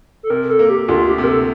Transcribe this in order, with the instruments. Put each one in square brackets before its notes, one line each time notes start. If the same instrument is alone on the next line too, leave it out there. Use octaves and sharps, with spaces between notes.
[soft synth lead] A4
[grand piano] C3 [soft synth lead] A#4
[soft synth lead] A4
[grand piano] A#3
[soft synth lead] G4
G4
[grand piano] D2 [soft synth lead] F4
[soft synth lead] G4
[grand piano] C3
[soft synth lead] A#4
A4